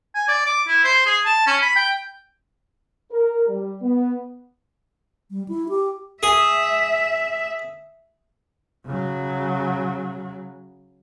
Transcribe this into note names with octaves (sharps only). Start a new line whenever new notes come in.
G#5
D5
D6
E4
C5
G#4
A5
C#4
B5
G5
A#4
G3
B3
G3
E4
G4
G#4 E5
C#3 F#3